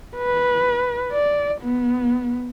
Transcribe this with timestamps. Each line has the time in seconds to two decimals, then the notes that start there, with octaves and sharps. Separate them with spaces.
0.17 B4
1.12 D5
1.61 B3